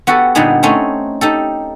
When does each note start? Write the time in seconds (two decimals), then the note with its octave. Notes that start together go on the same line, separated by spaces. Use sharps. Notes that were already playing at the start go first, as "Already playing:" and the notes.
0.07 B3 F#4 G4 A4
0.35 A#2 D3 G3 B3 D#4 G#4
0.63 A3 C4 C#4 D#4
1.21 D#4 G4 A4